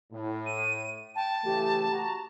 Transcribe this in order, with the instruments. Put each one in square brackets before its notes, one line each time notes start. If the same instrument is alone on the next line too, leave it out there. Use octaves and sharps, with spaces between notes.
[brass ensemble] A2
[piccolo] D#7
[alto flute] G5 [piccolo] A5
[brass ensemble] C#3 E3 A3 [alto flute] G4
[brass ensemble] F#4 A#5